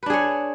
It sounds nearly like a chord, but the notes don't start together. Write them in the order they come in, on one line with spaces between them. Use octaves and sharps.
B4 D4 G#4 C#5